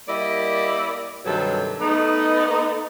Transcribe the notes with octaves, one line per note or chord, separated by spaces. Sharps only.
G3 A#3 E4 D5 D#5
G2 C3 D#3 F#3 A4
A3 B3 D#4